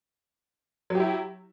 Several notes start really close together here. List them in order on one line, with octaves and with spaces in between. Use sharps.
F#3 G4 E4